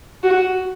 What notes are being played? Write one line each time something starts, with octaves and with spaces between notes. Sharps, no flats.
F#4